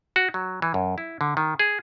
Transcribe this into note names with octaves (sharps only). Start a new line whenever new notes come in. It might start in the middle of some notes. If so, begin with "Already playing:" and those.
F#4
F#3
E3
F#2
E4
D3
D#3
G#4